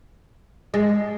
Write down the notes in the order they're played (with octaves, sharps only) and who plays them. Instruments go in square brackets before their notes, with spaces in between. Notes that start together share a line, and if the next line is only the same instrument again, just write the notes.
[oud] G#3